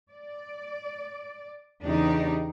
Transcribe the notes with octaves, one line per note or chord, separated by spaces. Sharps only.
D5
E2 C#3 D4 D#4 G4